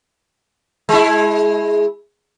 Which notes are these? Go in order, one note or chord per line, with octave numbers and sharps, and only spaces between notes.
G#3 E4